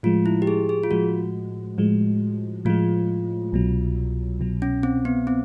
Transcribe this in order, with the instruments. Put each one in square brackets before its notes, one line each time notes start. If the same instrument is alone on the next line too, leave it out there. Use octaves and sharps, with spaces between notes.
[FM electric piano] A2 F3 G#3 [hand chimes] F4
[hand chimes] E4
G4
G#4
G#4
F4
[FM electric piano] A2 F3 G#3 [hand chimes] F#4
[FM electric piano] A2 F3 G#3
[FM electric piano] A2 F3 G#3 [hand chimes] F4
[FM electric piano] C2 B2 F#3
C2 B2 F#3
[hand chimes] C#4
C4
B3
C4